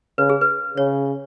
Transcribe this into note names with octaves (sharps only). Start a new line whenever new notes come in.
C#3 B4
G#4
B4
C#3 C#5